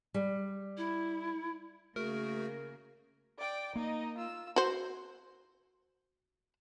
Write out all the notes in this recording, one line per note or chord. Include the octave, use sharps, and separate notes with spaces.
G3
E4
C#3 A3 A#3 F#4 G#4 A#4
D5 G5
A#3 D#4 D#5
F4 E6
F#4 C5